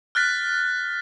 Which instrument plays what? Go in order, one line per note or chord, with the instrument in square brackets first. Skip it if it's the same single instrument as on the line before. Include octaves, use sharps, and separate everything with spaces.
[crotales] F6 F#6 A6 B6